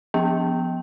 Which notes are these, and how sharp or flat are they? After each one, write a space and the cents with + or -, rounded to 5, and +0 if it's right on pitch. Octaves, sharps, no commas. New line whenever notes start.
F3 +0 B3 +0 G5 +0